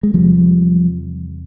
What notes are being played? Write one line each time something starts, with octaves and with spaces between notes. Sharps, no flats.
G#3
E2 C3 F3 G3